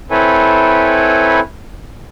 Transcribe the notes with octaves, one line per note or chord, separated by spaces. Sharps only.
C4 E4 A4 B4 C#5 G#5